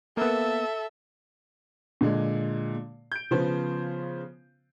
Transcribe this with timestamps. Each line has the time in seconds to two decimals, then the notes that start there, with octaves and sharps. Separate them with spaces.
0.17 A#3 B3 A4 E5
2.01 A#2 D3 G#3
3.12 G6 D7
3.31 C#3 F3 B3 C5